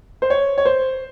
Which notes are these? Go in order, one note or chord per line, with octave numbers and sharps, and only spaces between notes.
C5
C#5
C#5
C5